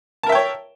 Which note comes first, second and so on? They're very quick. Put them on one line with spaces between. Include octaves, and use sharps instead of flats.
A5 A#4 E5 G5 C#5